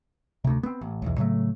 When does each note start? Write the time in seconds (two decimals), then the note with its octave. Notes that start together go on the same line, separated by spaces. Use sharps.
0.44 D2 C3
0.63 B3 C4
0.81 A1
1.02 B1 E2
1.18 A2 C#3 F#3 A3